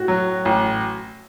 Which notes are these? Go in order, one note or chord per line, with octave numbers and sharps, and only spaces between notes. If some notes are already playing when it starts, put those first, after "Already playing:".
Already playing: A2 F#4
F#3
A1